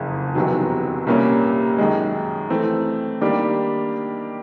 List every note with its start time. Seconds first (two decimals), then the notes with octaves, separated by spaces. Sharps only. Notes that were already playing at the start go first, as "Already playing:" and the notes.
Already playing: F#1 F2 C#3
0.35 F1 E2 C3 D#3 F#3
1.07 C2 A#2 G3 A#3 C#4
1.79 F#2 D#3 G#3
2.50 E3 A3 C4
3.21 D#3 G3 A#3 D4 G4